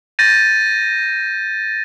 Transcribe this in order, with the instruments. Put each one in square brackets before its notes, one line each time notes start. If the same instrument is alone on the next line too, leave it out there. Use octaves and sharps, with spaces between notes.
[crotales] G6 A6 A#6 D#7